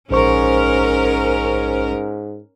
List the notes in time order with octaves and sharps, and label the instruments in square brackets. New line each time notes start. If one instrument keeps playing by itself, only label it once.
[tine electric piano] A#1 C5 C#6 [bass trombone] G#2 [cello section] C#4 A#4